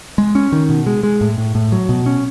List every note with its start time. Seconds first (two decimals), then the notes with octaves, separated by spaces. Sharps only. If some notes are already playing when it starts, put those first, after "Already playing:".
0.18 G#3
0.35 C#4
0.52 D#3
0.69 B2
0.87 G#3
1.03 G#3
1.21 A2
1.38 A2
1.55 A2
1.72 F#3
1.89 B2
2.06 C#4